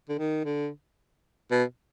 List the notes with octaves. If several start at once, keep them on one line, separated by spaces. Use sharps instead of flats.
D3
D#3
D3
B2